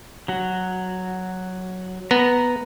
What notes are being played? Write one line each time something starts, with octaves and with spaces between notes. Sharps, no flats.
F#3 F#4
B3 A#5